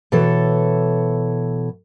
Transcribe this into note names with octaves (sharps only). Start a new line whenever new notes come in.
B2 E3 A4 C#5